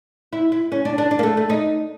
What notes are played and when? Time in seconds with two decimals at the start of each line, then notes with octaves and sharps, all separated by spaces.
0.33 E4
0.52 E4
0.72 C#4
0.85 D4
0.98 D4
1.11 D4
1.19 A#3
1.23 A3
1.37 A3
1.50 D#4